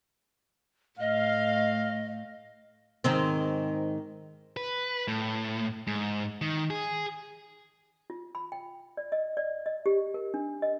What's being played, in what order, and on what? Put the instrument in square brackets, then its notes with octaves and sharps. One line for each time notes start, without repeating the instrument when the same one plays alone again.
[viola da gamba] A2 [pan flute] D#5 [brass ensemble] F5
[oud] G#2 D#3 C4
[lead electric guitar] B4
A2
G#2
D#3
G#4
[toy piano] F4
B5
G5
D5
D#5
D5
D#5
G4
A#4
D4
D#5